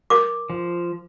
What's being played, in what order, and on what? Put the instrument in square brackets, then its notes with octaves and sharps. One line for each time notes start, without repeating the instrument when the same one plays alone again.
[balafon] A#4 [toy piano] D6
[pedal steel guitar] F3